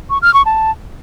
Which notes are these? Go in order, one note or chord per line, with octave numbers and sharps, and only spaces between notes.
C#6
F6
C#6
A5